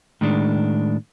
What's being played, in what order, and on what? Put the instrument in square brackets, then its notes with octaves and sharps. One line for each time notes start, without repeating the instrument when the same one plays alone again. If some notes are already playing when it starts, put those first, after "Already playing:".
[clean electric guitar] A2 D#3 G#3 D4